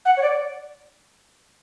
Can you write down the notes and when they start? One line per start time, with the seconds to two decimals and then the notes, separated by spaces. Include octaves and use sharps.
0.05 F#5
0.17 C#5
0.22 D5